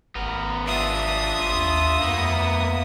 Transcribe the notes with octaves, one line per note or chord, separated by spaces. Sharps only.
G#1 B3 A#4
D4 F4 E5 D#6
D#2
F2 A#3 B3